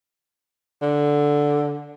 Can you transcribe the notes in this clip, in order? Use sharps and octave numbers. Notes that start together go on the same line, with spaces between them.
D3